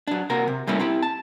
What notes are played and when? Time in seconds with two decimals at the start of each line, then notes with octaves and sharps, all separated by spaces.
0.07 F#3 D4
0.30 C3 A#3 F#4 A#4
0.48 C3
0.67 G3 A3 A#3 C4 C#4 E4
0.80 C4 E4 G4
1.03 A5